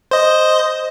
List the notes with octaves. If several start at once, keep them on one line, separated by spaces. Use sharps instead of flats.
C5 D#5